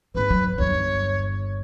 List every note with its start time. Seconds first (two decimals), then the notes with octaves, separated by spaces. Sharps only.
0.15 G#1 G#3 B4
0.30 F#3
0.58 G1 D#2 C#5